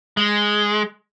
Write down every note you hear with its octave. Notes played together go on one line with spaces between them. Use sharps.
G#3